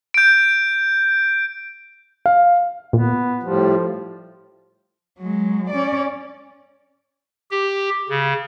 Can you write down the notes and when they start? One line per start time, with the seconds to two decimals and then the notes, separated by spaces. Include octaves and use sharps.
0.14 G6 D7
2.26 F5
2.93 A#2 B3
3.43 A2 F3 G3
5.19 F#3 G#3
5.69 C#4 D5
7.51 G4
8.10 C#3